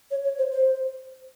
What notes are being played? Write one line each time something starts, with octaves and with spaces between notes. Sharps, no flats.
C#5
C#5
C5
C5